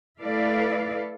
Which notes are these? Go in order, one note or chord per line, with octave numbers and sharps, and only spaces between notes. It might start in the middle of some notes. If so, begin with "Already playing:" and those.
A3 E4 A4 B4 D5 F5